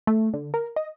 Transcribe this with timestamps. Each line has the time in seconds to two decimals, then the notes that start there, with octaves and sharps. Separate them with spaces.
0.07 A3
0.33 D3
0.54 A#4
0.76 D#5